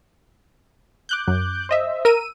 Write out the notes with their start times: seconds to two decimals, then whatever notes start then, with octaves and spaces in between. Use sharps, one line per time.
1.09 D6 F#6 G6
1.28 F#2
1.69 C5 D#5 E5
2.05 A#4 E6 D#7